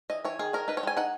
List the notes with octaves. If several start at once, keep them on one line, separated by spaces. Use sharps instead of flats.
E3 D#5
E3 C#5
D#3 G#4
D#3 A#4
D#4 B4
C#5
G#3 G#5
D#4 F#5